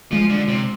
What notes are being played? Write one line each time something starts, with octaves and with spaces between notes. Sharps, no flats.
F3 G#3
D3
C3